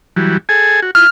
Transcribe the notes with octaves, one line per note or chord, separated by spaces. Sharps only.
E3 F#3 G3
G#4 A4 G#5
F#4
E4 F4 F6